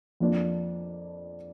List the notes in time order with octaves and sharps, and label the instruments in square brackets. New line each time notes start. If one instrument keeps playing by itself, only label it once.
[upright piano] F2 F3 A#3 D4